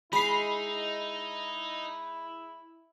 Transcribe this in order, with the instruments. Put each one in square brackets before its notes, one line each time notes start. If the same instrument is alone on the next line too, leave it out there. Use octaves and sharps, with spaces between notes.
[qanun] G#3 [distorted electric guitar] D#4 [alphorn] E4 [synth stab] B5 C7